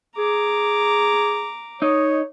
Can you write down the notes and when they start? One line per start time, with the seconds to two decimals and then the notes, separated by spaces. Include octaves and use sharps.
0.18 G#4 A#5 D6
1.82 D#4 C#5 D#5